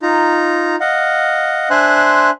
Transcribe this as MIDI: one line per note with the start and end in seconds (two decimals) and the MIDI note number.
0.02 0.76 63
0.02 0.76 65
0.02 0.76 82
0.80 1.69 75
0.80 1.69 77
0.80 1.69 78
1.70 2.30 62
1.70 2.30 72
1.70 2.30 76
1.70 2.30 80
1.70 2.30 84
1.70 2.30 90